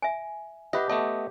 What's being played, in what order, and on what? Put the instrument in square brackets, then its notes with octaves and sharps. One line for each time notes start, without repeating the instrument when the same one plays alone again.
[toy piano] E5 G#5
[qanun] G4 [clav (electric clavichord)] B4 D#5 [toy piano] E5 F#5
[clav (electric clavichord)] A3 B3 D#5 [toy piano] A5